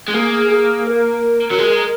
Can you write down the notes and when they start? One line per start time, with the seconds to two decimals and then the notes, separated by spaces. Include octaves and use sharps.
0.08 G#3
0.14 A#3 G#4
0.51 G#4
0.87 A#4
1.51 F#3
1.59 G#3